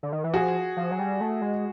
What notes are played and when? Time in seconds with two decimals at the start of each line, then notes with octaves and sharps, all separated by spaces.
0.03 D3
0.12 D#3
0.24 E3
0.34 F3 F#4 G#4
0.77 F3
0.91 F#3
0.99 G3
1.21 A3
1.41 G#3